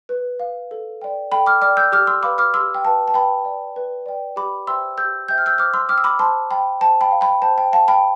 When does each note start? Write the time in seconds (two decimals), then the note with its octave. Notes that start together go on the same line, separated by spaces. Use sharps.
0.09 B4
0.40 F5
0.71 A4
1.02 D5 G5
1.31 A4 G5 B5
1.46 D6 F6
1.62 D5 G5 D6 F6
1.77 E6 G6
1.92 G4 D6 F6
2.07 C6 E6
2.23 B4 F5 B5 D6
2.38 D6 F6
2.54 G4 C6 E6
2.75 G5
2.85 B4 F5 A5
3.08 A5
3.14 B4 G5 B5
3.45 D5 G5
3.76 B4
4.06 D5 G5
4.36 G4 B5 D6
4.67 C5 E5 G5 C6 E6
4.98 G4 E6 G6
5.28 C5 E5 G5 G6
5.38 F6
5.46 E6 G6
5.58 C5 D6 F6
5.74 C6 E6
5.89 G5 D6 F6
5.98 E6
6.04 B5 D6
6.19 C5 A5 C6
6.51 G5 B5
6.81 C5 A5
7.01 G5 B5
7.11 F5
7.21 G5 B5
7.42 C5 A5
7.58 G5
7.73 F5 A5
7.88 G5 B5